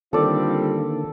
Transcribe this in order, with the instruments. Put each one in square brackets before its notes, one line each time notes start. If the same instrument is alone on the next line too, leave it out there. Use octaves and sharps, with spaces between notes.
[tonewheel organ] D3 D#3 A#3 [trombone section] G3 C4 F4 [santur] A4 D5